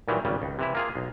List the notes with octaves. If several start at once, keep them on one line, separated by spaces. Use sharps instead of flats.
A#2 D#3 E3 F#3 G3
G#1 C#3 G3
C#2
C3 E3 E4
A#3 F4 G#4
B1